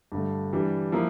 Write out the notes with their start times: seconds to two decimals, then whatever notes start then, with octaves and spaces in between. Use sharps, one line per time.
0.12 G2 D3 A3
0.53 E3 G3 D4
0.92 F3 A#3 E4